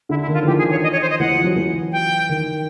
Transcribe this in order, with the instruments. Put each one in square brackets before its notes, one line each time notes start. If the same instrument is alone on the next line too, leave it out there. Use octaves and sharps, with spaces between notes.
[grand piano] D3 [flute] E4
[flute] E4
[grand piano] D#3
[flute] F4
[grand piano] F3
[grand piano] E3 [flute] G4
[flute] G#4
C#5
D#5
C#5
C5
D#5
[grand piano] E3 [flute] F#5
[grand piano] F3
F#3
E3
[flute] G5
[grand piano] D#3